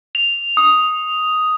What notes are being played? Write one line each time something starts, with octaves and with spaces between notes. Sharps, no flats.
F7
D#6